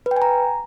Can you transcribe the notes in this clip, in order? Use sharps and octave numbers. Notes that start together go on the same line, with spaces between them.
B4
G5
G#5
A#5